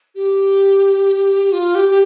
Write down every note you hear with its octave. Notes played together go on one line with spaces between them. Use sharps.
G4
F4
G4
G4